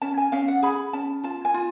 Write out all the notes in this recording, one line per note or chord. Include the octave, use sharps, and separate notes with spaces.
C#4 A5
G#5
C#4 F5
F#5
G#4 B5
C#4 A5
F4 A5
G#5
F4